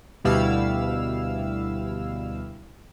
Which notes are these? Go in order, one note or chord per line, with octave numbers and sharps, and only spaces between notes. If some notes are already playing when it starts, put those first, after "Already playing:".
D2 B2 G3 E4 F5 E6